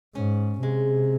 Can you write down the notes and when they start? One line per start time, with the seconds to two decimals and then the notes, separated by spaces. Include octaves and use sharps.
0.15 G#2 C#4
0.62 C3 G#3